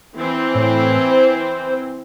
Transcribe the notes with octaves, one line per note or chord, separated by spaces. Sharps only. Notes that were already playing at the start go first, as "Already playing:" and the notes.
E3 C4
A2
C5